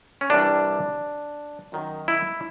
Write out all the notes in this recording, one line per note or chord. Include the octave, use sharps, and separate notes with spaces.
C#4
C2 C3 E3 G3 D4
F#2 D#3 F#3
E4